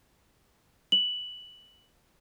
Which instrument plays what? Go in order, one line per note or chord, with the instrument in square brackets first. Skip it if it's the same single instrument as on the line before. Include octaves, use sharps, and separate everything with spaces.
[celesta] F#7